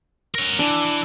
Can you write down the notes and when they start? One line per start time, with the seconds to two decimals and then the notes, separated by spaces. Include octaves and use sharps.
0.35 A#4 C#5
0.59 E3 D4